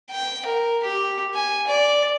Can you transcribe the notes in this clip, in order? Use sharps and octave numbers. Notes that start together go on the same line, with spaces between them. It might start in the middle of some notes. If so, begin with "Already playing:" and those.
G5
A#4
G4
G#5
D5